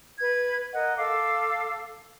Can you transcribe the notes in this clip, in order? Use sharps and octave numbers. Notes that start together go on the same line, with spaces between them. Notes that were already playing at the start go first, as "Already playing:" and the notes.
B4 G#6
A#4 D#5 F#5
A4 F5 D6 E6